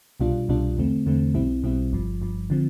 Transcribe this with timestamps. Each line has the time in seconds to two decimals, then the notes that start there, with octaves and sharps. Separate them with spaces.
0.20 C2 B2 G3 D4 F4
0.49 C2 B2 G3 D4 F4
0.77 E2 D3 A3 C4
1.06 E2 D3 A3 C4
1.34 B1 B2 G3 C4 E4
1.63 B1 B2 G3 C4 E4
1.92 G1 G2 F3
2.21 G1 G2 F3
2.50 D3 F3 C4